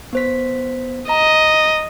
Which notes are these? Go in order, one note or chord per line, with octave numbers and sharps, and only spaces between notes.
B3 C5 B6
D#5 A#5